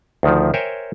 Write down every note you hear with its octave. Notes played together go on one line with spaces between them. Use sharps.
D2 D#3 F3
A#4 C5 C#5 E5 G5 G#5